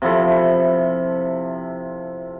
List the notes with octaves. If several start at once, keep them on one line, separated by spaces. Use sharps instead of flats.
C3 F3 E4 A4